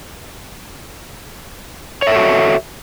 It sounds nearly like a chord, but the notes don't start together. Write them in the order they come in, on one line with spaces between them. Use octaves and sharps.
C#5 E5 A4 F#4